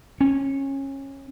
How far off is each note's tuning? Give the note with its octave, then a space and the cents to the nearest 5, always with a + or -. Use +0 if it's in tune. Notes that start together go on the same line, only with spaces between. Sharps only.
C#4 -20